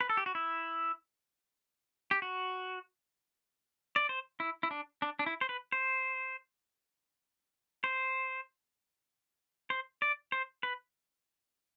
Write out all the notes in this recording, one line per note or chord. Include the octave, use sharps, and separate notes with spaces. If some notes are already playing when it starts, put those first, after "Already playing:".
B4
A4
G4
F#4
E4
G4
F#4
D5
C5
E4
E4
D4
D4
D4
E4
C5
B4
C5
C5
C5
D5
C5
B4